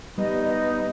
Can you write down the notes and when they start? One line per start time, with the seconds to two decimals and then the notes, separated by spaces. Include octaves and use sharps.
0.18 G3 B3 D#4 D#5